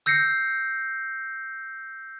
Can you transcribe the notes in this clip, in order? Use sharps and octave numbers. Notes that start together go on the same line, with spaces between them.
E6 G6 A#6 C7 C#7